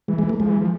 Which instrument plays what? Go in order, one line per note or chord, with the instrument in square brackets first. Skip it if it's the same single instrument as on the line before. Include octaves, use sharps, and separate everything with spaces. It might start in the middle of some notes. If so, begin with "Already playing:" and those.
[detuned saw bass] E3 [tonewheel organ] G#3
[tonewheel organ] G#3
A3
[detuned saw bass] F3 [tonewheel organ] G#3
[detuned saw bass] E3
F3